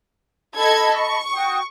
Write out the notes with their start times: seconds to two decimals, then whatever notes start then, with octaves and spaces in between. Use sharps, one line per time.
0.56 A4 D#5 A5 B5 G#6
0.98 C#6
1.34 F#4 G5 D#6